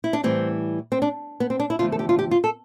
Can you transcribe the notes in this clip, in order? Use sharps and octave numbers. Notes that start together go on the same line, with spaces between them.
E4
D4
A2 E3 G3 C4
C4
D4
B3
C4
D4
E4
E2 D3 F3 A3 F4
A4
G4
F4
G4
F4
A4